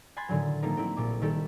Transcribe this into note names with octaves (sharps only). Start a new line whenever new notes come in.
G#5 B5 C6 F#6 G#6 A6
A2 D3 D#3 F#3
F3 G3 A3 A#3 C4 D#4
C4 E4
A#1 A#2 D6
D#3 G3 E4 G4 A4